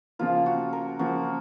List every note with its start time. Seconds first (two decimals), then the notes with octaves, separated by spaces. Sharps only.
0.19 C#3 F3 A#3 F4
0.46 F#4
0.73 A#4
0.99 C#3 F3 A#3 F#4